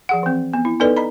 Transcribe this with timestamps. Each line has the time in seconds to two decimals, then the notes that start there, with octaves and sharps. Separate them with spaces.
0.09 F3 G#4 F#5
0.23 E3 C4
0.53 B3
0.65 E4
0.80 B3 D#4 A4 B4 D5 D#5
0.96 D#5 A#5 B5